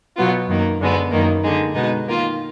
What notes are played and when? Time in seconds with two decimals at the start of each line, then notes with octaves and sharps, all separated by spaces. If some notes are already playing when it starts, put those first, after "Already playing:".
0.16 B2 F#3 B3 F4
0.48 F#2 D#3 A#3
0.79 F#2 D3 G#3 B3
1.11 F#2 D#3 A#3
1.43 D3 G#3 D#4
1.74 B2 G#3 B3 D#4
2.06 D#3 A#3 F4